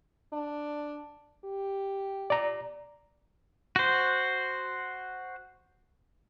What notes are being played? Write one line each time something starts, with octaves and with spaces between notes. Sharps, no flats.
D4
G4
D5 A#5
F#4 C5